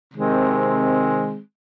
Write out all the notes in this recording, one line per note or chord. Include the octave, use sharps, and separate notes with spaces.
C3 D#3 G#3 C4